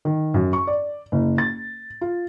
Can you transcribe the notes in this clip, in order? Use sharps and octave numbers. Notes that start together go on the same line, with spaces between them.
D#3
F#2
C#6
D5
F#1
A6
F4